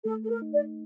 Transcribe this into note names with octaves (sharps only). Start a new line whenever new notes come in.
A3 A4
A4
A#4
D#4
D5